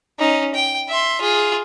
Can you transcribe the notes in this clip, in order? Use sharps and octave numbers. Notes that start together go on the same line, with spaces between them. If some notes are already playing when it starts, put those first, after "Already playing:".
C#4 D#4
G5
E5 C6
F4 G#4